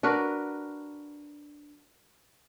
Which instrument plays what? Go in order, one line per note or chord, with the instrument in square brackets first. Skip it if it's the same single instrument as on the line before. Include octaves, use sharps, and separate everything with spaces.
[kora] D4 F#4 A#4 B4